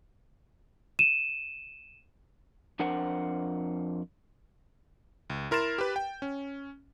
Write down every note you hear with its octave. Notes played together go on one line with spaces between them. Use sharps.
D#7 E7
F2 D4 A#4 C5 F#5
C#2
E4 A#4 C6 A6 E7
G4 B4
G5
C#4